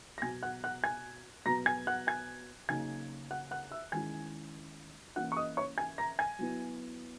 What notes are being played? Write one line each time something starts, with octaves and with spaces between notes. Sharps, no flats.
A#6
B2 F#3 B3 G#5 G#6
F#5 F#6
F#5 F#6
G#5 G#6
B2 F#3 B3 A#5 A#6
G#5 G#6
F#5 F#6
G#5 G#6
C#3 F#3 A#3 D#4 G#5 G#6
F#5 F#6
F#5 F#6
E5 E6
D#3 G#3 C#4 E4 G#5 G#6
E3 A#3 C#4 E4 F#5 F#6
C#6
D#5 D#6
C#5 C#6
G#5 G#6
A#5 A#6
G#5 G#6
F#3 B3 E4